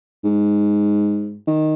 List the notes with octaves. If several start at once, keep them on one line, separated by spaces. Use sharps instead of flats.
G#2
D#3